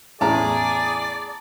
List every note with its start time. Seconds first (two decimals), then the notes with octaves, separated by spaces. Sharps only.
0.21 E2 A2 C#4 G#4 D5 A5 A#5